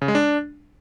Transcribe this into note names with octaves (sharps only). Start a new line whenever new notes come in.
C#3
G#3
D4